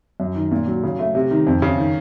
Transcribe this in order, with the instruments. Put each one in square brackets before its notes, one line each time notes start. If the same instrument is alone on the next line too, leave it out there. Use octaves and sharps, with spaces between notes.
[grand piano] F#2
D#3
A#2
F#3
C#3
A3
C3
D#3
F2
C#3
D#3